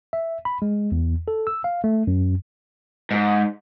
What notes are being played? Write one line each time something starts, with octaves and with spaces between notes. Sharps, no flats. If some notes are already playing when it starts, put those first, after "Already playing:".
E5
B5
G#3
E2
A4
E6
F5
A3
F#2
G#2